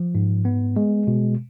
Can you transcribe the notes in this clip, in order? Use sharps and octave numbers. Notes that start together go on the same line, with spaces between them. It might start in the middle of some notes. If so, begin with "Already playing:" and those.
Already playing: F3
G#2
B3
G#3
B2